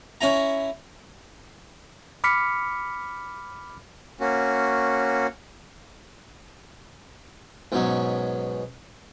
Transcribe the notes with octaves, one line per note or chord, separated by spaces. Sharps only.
C#4 E4 A#5
B5 D6 F6 B6 C#7
A#3 C#4 F#4
G#2 B2 F#3 C#4